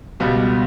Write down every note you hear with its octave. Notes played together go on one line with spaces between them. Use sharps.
C#2 B2 G3 B3